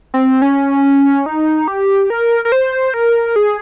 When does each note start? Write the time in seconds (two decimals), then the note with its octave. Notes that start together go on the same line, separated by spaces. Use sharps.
0.14 C4
0.42 C#4
1.26 D#4
1.68 G4
2.10 A#4
2.45 A#4
2.52 C5
2.94 A#4
3.36 G#4